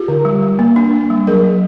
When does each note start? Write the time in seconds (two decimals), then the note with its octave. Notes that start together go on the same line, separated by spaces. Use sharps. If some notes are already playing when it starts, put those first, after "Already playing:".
Already playing: F4 G4
0.08 D3
0.25 G3
0.42 G3
0.59 A#3
0.76 D4
0.93 A#3
1.10 G3
1.27 F#3 G#4 A#4
1.44 F#3